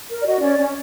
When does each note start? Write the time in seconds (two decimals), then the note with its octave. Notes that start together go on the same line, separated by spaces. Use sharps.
0.09 A#4
0.21 D5
0.26 F#4 D#5
0.41 C#4 D5
0.58 C#4